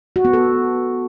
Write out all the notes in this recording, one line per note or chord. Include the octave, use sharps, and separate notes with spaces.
F#4
B3
A4